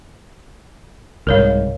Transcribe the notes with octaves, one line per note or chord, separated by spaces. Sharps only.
C2 G#2 A#4 C#5 F5